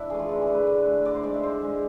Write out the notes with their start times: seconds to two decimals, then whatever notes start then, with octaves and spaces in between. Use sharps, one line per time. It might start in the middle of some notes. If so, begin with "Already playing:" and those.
Already playing: D4 E4 B4
0.10 E3 A3 G#4
0.19 F4
0.29 D3 E4
0.42 G#4
0.47 A3
0.54 B4
0.67 D3
0.86 A3
1.05 D3 D5
1.15 C5
1.23 G#3 D5
1.34 E5
1.43 D3 C5
1.62 G#3 G#4